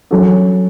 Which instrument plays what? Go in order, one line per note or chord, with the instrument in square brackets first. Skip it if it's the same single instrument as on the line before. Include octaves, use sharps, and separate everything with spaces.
[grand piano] F#3 C#4 F#4 A4